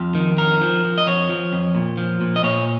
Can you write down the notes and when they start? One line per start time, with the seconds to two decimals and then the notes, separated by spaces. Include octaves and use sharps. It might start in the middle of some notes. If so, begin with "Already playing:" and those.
Already playing: F2 F4
0.15 D#3
0.37 F2 A#4
0.61 F3
0.84 F3
0.98 D#5
1.07 F2 C#5
1.29 F3
1.53 F2
1.75 A#2
1.97 F3
2.21 A#2
2.36 D#5
2.43 A#2 C#5